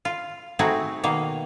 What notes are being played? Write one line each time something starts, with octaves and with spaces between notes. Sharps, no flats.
F4
A3 C4 D#4 E4 F#4 G#4
B2 D#3 A#3 F5